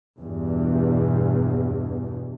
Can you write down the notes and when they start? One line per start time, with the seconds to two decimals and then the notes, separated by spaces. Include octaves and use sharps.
0.20 E2 G2 B2